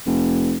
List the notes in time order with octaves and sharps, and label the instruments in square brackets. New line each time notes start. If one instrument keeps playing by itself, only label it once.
[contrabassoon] F1